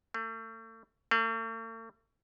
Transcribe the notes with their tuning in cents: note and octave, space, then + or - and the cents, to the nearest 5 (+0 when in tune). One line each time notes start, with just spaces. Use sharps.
A3 +35
A3 +45